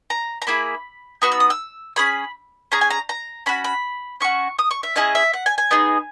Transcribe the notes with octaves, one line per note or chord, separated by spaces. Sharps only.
A#5
A#5
A#3 E4 G#4 B5
B3 D#4 F#4 C#6
E6
D#6
E6
C#4 G#4 B5
C#4 G#4 A#5
G#5
A#5
A#5
C#4 F#4 B5
B5
C#4 F#4 C#6
D#6
C#6
E5
C#4 E4 G#4 D#5
E5
F#5
G#5
G#5
B3 D#4 G#4